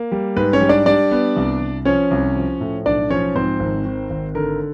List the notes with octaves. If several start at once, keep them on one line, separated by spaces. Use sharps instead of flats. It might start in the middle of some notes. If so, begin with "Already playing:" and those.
Already playing: A#3
G3
G#2 B4
C#4 C#5
G3
D4 D5
G3 D4 D5
B3
C2
C2
F3 C#4 C#5
C2
F3
A2
B1 D4 D5
F3 C#4 C#5
G#2 C4 C5
G#1
D#3
G#1
D3 A#4